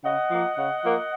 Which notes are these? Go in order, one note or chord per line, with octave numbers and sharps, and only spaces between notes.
C#3 D#5 F#5
F3 A#3
C#3
F3 A#3